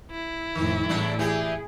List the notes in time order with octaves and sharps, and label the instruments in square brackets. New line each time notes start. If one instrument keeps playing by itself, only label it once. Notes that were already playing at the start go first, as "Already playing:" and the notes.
[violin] E4
[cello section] F2 A2 [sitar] D#3
[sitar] E2 D4 [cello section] A2 G3
[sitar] E3 G4 [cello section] G#4